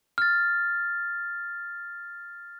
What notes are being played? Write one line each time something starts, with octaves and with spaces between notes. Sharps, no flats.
F6 A6